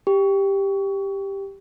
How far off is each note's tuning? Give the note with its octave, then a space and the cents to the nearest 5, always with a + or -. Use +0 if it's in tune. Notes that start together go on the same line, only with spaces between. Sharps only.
G4 +5